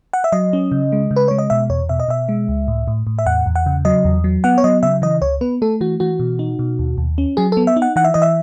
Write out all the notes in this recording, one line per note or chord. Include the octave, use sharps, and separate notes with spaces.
F#5
E5
F#3 D#5
C#4
C#3
G#3
C#3
B4
G#3 C#5
D#5
B2 E5
E2 C#5
B2 E5
D#5
B2 E5
G#3
C#2
A2
A2
A2
E5
E2 F#5
E2
F#5
C#3
F#3 D#5
E2
F#3
B3 F#5
C#5
F#3 D#5
C#3 E5
E3 D#5
C#2 C#5
B3 B4
A3 A4
E3 F#4
E3 F#4
B2
D#4
B2
D#2
D#2
C#4
F#3 G#4
B3 A4
E5
D#4
F#5
E3 F#5
E5
E3 D#5
E5